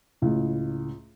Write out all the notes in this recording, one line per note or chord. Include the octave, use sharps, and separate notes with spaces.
C#2 A2